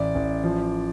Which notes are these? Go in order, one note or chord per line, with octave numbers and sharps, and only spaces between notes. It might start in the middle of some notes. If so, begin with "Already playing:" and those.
Already playing: A1 D5
A1
F3